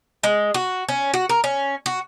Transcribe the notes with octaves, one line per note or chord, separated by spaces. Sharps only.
G#3
F#4
C#4
F#4
A#4
C#4
F#4